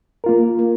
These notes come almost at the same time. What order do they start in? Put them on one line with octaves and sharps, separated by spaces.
A#4 F4 A#3